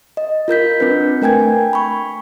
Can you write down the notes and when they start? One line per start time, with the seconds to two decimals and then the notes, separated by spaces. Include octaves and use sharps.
0.17 D#5
0.48 F4 A#4 G6 B6
0.80 C4 D4 B4
1.22 A3 A#4 G5 G#5 G#6
1.73 B5 C#6